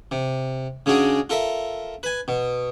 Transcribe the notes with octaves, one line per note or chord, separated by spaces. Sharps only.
C3
C#3 G#3 D4 F#4 G#4
F4 A4 A#4 E5
B4 G#5
B2